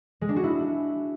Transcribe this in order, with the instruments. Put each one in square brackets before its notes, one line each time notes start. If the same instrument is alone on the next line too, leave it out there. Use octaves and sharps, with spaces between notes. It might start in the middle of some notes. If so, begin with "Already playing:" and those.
[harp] G#3
D4
F#4
E4